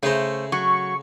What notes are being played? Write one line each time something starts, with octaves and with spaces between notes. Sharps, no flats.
C#3 A3 G#4 C5 A#5
F#3 C#6